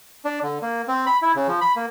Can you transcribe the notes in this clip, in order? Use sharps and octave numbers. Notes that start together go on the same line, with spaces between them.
D4
D3
A#3
C4
B5
E4
C#3
F3
B5
A#3